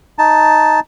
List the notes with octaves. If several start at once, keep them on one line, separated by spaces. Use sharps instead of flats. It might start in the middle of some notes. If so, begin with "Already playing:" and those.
D#4 A5